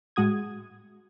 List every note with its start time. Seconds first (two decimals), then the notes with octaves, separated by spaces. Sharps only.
0.16 A2 G#3 F#4 D#6 G#6